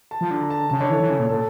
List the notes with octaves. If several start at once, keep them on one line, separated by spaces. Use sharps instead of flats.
A5
F3
D3
A#5
A5
C#3 A5
D3 C#5
E3 A4
E3
C#3
A#2
A#2 A4